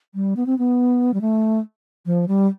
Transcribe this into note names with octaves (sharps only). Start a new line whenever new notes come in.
G3
B3
C4
B3
G3
A3
F3
G3